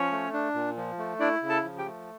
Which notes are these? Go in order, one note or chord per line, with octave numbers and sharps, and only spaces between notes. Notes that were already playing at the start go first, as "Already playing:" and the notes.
Already playing: F3 C#4 C#5
A3
D4
A#2
F3
A3
D4 E4 D5
C#3
A4 A5
F3
G4 G5
A3